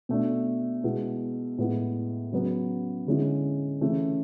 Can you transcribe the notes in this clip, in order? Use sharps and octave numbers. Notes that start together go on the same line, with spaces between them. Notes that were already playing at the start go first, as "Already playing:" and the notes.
B2 A3 D4
B2 G#3 B3 E4
A2 G#3 B3 E4
C#3 F#3 B3
D3 G#3 C#4 E4
C#3 E3 A3 C#4